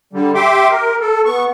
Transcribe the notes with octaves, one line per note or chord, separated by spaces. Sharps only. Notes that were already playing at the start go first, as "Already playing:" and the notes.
D3 G3
G4 E5 G5 C6 D6
A#4
A4
B3 C#6